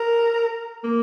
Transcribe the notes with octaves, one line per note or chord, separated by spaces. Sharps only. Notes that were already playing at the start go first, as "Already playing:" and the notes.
Already playing: A#4
A#3